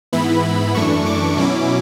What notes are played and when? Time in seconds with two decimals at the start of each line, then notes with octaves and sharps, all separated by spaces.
0.13 G#2 E3 B3 E4 B5
0.75 F#2 E3 A3 D4 C#6
1.06 D6
1.37 B2 F#3 C#4 E4